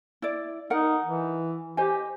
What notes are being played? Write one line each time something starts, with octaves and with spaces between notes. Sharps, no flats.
E4 D5
D#4 A#4 F#5
E3
G4 C5 D#5 G#5